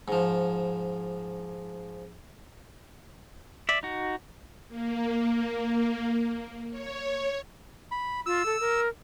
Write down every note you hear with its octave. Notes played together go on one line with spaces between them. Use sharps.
G#2 F3
D5 E5
D#4 F#4
A#3
C#5
B5
F4 E6
A4
A#4